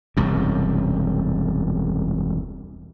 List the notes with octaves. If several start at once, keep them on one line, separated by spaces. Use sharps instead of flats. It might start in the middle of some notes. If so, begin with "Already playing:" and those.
E1 C2 F#2